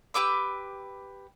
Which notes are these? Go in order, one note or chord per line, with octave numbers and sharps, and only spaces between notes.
G4 B4 D6 E6